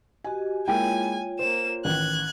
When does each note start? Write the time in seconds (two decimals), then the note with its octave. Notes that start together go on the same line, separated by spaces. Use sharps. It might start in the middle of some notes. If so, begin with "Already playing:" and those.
0.24 F#4 G4 D#5 G#5
0.68 G#3 A#3 E4 F4 C#5 G5 G#5
1.39 A#3 C5 E7
1.85 A1 D#3 F#6 G#6